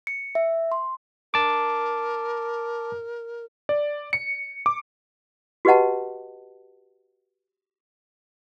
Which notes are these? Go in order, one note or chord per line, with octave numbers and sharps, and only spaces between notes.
C#7
E5
C6
A#4 A5 D6
D5
C#7
D6
F#4 G4 B4 D#5 F#5 A5